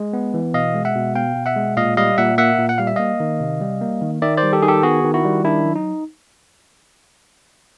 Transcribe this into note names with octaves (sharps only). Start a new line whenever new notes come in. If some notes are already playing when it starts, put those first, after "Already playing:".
Already playing: G#3
B3
E3
B2 D#5 F5
G#3
E5 F#5
B2
B3 F5 G5
B2
E5 F#5
G#3
A#2 D#5 F5
G3 D#5 F5
A#2 E5 F#5
A#3 E5 F#5
A#2
F#5
G3 F5
E5
A#3 D#5 F5
D#3
C3
G3
A#3
D#3
D#3 D5 E5
C5 D5
G3
G4 A4
D#3 G#4
G4 A4
B3 F#4 G#4
D#3
E4 F#4
G3
D#3 D4 E4
F#3
D#4